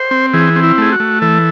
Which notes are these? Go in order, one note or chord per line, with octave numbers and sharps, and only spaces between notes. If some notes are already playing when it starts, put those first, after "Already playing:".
Already playing: C5
C4
E3 G#4
C4
E4
A3 G#4
F#4
A3
E3 A4